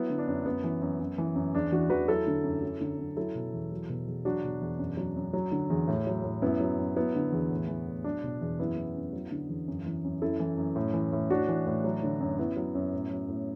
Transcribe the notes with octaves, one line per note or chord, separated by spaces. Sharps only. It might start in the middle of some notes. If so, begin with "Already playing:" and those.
Already playing: F#3 B3 E4
D3
D4
F#2
F#2 B3
E3
F#2
F#2
E3
F#2
E2 D4
E3 D4 F#4
E2 F#4 B4
F#3 E4 A4
D3
F#2
F#3
D3
F#2
F#3 E4 A4
B2
E2
F#3
B2
E2
F#3 D4 F#4
B2
E2
F#2
F#3
F#2
F#3
D3
E2
A2
F#3
A2
F#2 B3 E4
F#3
F#2
F#3 B3 E4
D3
E2
A2
E3
A2
F#3 D4
B2
E2
F#2 B3 E4
E3
F#2
F#3
D3
E2
F#2
E3
F#2
F#2 E4 A4
E3
F#2
A2
E3
A2
A2 D4 F#4
E3
A2
F#3
D3
F#2
F#2 B3 E4
F#3
F#2
A2
F#3
A2